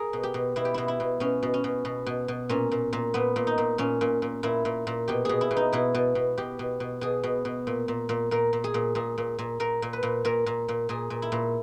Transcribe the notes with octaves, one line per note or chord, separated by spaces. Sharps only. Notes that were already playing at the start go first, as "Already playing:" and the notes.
Already playing: G#4 A#4
B2
G4
B2
B2 E4
G4
B2 E4
E4
B2
B2 C#4
B2
C#4
B2
B2
B2
B2
A#2 C#4
A#2
A#2
A#2 B3
A#2
D#4
A#2
A#2 C#4
A#2
A#2
A#2 E4
A#2
A#2
B2 G4
B2 G#4
E4
B2
D#4
B2 E4
B2
B2
B2 G4
B2
B2
B2 G#4
B2
B2
A#2
A#2
A#2
A#2 A#4
A#2
G#4
A#2
A#2 G#4
A#2
A#2
A#2 A#4
A#2
B4
A#2
A#2 A#4
A#2
A#2
A#2 G#4
A#2
E4
A#2